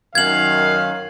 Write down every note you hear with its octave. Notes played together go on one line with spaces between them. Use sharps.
F#2 D#3 F5 G#6 F#7